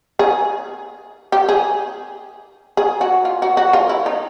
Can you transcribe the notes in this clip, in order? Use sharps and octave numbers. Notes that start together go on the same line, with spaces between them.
G#4
G4
G#4
G#4
F#4
F4
F#4
F#4
F4
E4
D#4